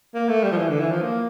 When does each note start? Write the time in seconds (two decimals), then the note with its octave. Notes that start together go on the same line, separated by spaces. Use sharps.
0.15 A#3
0.29 A3
0.43 G3
0.52 F3
0.58 E3
0.69 D3
0.80 E3
0.91 F3
1.02 A#3